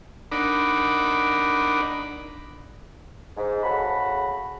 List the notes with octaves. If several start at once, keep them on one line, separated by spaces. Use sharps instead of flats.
D4 D#4 A#4 D5 F#5 B5
G#2
C#3 F#4 A4 B5